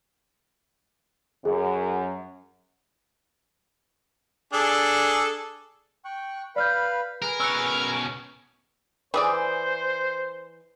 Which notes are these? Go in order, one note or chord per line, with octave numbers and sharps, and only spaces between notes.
F#2 G#4
D4 G#4 A4
G5 C#6 F#6
B4 D5 F5 B5 F6 G6
G#4 A#4 B4
B2 C#4 E6 F#6 C#7
E3 G#4 C5 D5